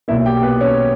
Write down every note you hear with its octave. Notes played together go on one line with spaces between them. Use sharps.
B1 A#2 A#3 E4 E5
G4 G5
B3 B4
C#4 C#5